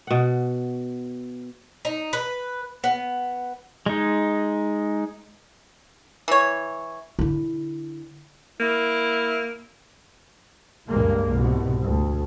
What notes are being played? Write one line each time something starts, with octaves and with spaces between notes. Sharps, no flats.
B2 F#5
D#4
B4
B3
G#3 D#4
E3 C#5
D3 E4
A#3 E4
C#2 G2 G#3 A#3
C2 G#2 B2
D2